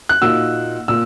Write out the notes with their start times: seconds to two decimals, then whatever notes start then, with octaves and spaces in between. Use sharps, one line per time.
0.09 F#6
0.22 A#2 A#3 D#4 F#4 E6
0.88 A#2 E6